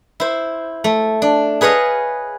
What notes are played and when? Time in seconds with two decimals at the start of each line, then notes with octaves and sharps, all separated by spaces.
0.20 E4 C5
0.84 A3
1.22 D4
1.61 G#4 B4 C#5 D#5 F5